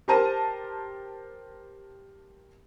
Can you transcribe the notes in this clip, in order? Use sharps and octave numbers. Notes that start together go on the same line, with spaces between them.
G4 A#4 C5 A5 A#5 D#7